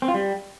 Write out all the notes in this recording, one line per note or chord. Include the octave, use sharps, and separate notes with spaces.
C4
F4
G3